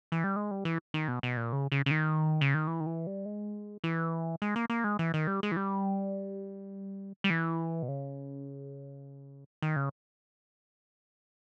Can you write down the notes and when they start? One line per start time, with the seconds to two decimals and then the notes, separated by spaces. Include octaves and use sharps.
0.12 E3
0.24 G3
0.36 G#3
0.51 G3
0.65 E3
0.94 D#3
1.08 B2
1.23 B2
1.37 A#2
1.53 C#3
1.72 C#3
1.86 C#3
1.91 D#3
2.41 C#3
2.54 D#3
2.67 E3
2.80 D#3
2.86 E3
3.07 G3
3.25 G#3
3.84 E3
4.42 G#3
4.56 A#3
4.70 A#3
4.84 G#3
4.99 E3
5.14 D#3
5.27 G3
5.43 G#3
5.52 E3
5.57 G3
7.24 G3
7.30 E3
7.83 B2
7.88 C#3
9.62 D#3
9.76 C#3